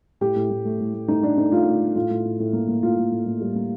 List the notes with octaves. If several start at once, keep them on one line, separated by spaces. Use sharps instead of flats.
A2 G4
A2
A2
A3
A2
A3
A3 D#4
A3 D4
A3 D#4
A3 F4
A3
A3
A2 F4
A2
A2
A2
A#3
A#3
A2 F4
A2
A2
A2
G3
A#3